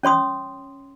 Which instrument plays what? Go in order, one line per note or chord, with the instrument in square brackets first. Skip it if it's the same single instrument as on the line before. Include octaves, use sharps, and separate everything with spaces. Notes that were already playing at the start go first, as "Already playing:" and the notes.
[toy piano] C#4 C#5 C6 D#6